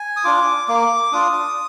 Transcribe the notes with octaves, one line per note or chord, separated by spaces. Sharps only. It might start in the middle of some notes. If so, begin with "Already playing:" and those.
Already playing: G#5
D#6
D4 F4 D6
A#3 D6
D4 F4 D#6